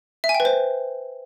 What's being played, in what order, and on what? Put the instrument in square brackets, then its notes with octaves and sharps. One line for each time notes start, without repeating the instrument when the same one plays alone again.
[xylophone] E5
G#5
G5
B4
C5